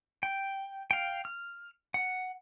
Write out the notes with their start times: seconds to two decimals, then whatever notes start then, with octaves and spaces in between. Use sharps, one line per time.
0.23 G5
0.91 F5 G5
1.25 F6
1.94 F#5